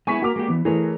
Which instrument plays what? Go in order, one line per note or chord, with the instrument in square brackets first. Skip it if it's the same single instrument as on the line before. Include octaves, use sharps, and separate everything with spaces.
[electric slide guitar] G#3 B3 E4 [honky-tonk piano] G#5 C#6 B6
[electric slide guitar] A#3 A#4 [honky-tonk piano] F#4 D6
[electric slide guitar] G#3 A#3 G4
E3 B3
[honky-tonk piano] E3 A3 [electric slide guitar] G#4 A#4 C#5